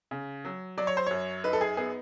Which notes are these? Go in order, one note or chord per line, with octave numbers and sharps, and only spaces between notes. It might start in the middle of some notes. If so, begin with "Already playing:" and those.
C#3
F#3
F#3 D5
C#5
C5
F#2 C#5
D#4 B4
A4
G#4
B3 G#4